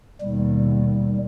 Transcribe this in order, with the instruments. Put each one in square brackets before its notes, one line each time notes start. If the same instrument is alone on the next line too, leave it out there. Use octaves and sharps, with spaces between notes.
[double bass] D#2 B2 [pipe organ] G3